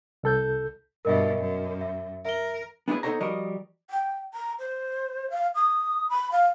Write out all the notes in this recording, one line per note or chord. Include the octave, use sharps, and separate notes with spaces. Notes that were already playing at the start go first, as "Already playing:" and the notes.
C2 A4 G6
G2 B2 A#4 D#5 E5
F#2
E5
A#4 E5 G7
B3 D4 E4 G#4 B4
B3 D#4 A4 C5 C#5 A#5
F3 G3 F#4 A#4 D#5
G5
A#5
C5
F5
D#6
B5
F5